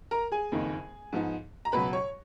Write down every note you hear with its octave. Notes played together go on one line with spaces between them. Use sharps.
A#4 A#5
G#4 G#5
F#1 F2 D#3 A#3 D#4
G#2 F3 B3 D#4
A#5
C#2 B2 F#3 B4 B5
C#5 C#6